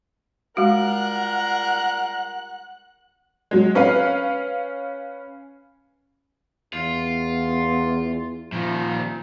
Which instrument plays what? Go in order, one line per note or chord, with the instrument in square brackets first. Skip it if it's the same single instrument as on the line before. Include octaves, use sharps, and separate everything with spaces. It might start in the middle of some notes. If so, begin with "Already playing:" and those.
[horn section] G3 F4 A#4 [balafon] G#3 F#4 [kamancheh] F#5 F#6
[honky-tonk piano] F#3 G#3
C#4 B4 F5
[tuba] E2 [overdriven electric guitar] F4
[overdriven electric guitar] A#2 D#3 [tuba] F3